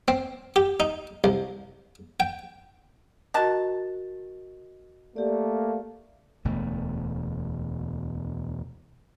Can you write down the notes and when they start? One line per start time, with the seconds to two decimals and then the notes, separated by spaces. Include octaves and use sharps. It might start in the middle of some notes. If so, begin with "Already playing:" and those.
0.08 C4
0.56 G4
0.80 D#4
1.24 C2
2.20 G5
3.34 D#3 F#4 A#4 A5 F#6
5.16 A3 A#3 G4 D5
6.45 E1 D2 B2 A3